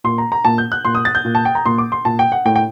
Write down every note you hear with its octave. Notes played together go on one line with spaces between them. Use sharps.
A#2 C6
A#5
A#5
A#2 A5
G6
F#6
A#2 C6
D#6
A6
G6
A#2
A5
G5
A#5
A#2 C6
D6
C6
A#2 A5
G5
F#5
A2 G5
G5